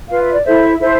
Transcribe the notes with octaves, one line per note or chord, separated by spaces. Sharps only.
F4 B4 F5
E5
D5
E4 A4 C5 E5
E4 A4 C5 E5